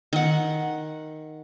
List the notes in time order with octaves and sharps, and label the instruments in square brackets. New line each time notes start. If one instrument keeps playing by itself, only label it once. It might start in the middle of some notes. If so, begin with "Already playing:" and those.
[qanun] D#3 F#5